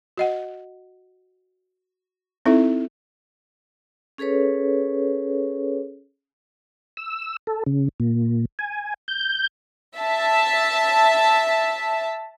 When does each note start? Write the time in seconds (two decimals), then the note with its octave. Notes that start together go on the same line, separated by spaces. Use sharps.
0.17 F#4 D#5 F#5
2.46 C4 D#4 E4 A4 E5
4.18 C#4 G#4 A4 B4 C#5
6.97 E6
7.47 A4
7.66 C#3
8.00 A#2
8.59 G#5
9.08 G6
9.98 E5 A5